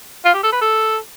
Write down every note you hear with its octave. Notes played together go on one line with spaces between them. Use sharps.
F4
G4
A4
B4
A4